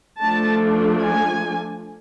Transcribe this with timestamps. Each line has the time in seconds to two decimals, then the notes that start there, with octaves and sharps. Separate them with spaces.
0.21 F3 A3 D4 A5
1.04 G#5